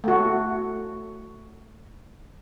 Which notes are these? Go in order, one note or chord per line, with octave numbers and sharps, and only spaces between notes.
A3 F#4